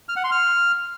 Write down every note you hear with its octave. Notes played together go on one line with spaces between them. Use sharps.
F6
F#5
C6
F6